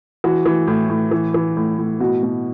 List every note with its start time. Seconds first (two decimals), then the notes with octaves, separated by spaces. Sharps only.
0.24 E3 F#4
0.46 E3
0.67 A2
0.89 A2
1.11 E3
1.34 E3
1.57 A2
1.78 A2
2.00 B2 F#4
2.23 B2